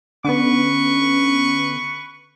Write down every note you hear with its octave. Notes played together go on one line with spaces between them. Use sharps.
D3 B3 C#4 B4 C#6